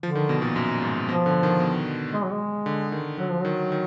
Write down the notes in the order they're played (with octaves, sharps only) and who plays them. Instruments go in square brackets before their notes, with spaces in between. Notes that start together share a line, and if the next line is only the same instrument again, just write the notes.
[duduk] D3 [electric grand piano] F3
[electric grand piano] D#3
B2
A#2
F#2
G#2
[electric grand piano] B2 [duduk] F3
[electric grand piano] D3
D#3
B2
[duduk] G#3
F#3
G#3
[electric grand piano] D3
D#3
[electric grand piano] D3 [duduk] F#3
[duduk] F3
[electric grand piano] D#3 [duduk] F#3
[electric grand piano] D#3